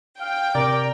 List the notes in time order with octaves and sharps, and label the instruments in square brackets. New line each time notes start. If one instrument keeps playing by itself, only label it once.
[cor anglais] F5 [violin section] G5
[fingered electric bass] C3 [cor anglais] A#4 [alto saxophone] D5